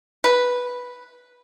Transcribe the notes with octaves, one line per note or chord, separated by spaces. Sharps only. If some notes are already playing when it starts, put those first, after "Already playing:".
B4